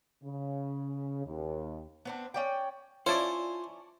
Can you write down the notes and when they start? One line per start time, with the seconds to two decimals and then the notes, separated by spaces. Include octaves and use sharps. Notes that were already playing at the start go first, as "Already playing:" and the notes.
0.24 C#3
1.26 D#2
2.05 B3 C4 D4
2.34 C#4 D5 G5
3.06 C#4 E4 F4 C5 D5 A5 C#6